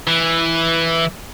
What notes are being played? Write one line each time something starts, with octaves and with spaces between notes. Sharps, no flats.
E3